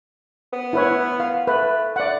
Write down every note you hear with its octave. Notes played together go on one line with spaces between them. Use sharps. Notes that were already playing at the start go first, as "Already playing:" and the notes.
B3
E4 B4 C#5
F5
A3 B4
A3 D5 F#5